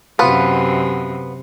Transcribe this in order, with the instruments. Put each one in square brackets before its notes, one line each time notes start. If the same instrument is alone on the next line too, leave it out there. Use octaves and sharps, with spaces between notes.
[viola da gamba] F#2 C3 [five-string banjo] B3 F4 B4